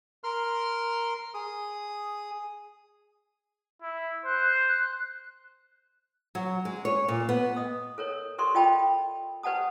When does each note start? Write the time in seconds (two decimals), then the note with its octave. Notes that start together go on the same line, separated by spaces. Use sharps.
0.24 A#4 C6 F6
1.34 G#4 D#6
3.82 E4
4.25 C5 F#6
6.35 F#3
6.65 G#3
6.85 C#5
7.08 A#2
7.29 B3
7.56 D#5 D#6
7.98 A4 A#4 C#5
8.38 G4 A4 A#4 D5 C6 C#6
8.54 F4 D#5 G5 A5 B5
9.43 G4 B4 D5 F#5 A5 D#6